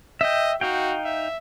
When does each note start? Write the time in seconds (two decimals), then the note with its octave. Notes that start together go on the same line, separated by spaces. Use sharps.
0.21 D#5 E5 G5
0.61 D#4 F#4 F5 G5
1.05 E5